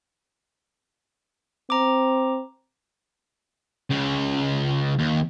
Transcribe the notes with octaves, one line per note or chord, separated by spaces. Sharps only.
C4 A#5 D6
C#2 C#3
D#2